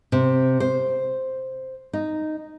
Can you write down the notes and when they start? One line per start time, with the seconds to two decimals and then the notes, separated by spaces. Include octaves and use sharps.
0.12 C3
0.60 C5
1.93 D#4